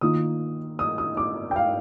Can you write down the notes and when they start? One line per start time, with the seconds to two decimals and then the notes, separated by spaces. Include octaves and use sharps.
0.01 D#3 A#3 F4 D#6
0.79 D#6
0.98 D#6
1.17 D6
1.51 G5
1.56 F5